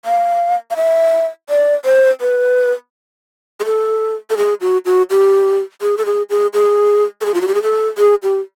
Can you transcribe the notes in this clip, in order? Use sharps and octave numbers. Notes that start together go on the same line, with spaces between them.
F5
F5
E5
D5
C5
B4
G#4
A4
A4
G#4
F#4
F#4
G4
G#4
A4
G#4
G#4
G#4
A4
G#4
F4
F#4
G4
G#4
A4
G#4
G4